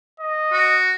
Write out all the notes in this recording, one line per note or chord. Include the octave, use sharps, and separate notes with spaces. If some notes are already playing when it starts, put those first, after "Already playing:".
D#5
F#4